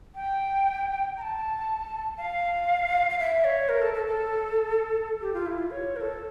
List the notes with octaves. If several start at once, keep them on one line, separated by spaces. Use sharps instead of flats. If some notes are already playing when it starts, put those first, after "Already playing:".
G5
A#5
A5
F5
F5
E5
C#5
A#4
A4
A4
A4
G4
F4
E4
F4
C#5
A#4
A4